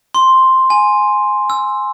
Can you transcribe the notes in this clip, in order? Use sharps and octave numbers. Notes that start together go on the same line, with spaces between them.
C6
G#5
E6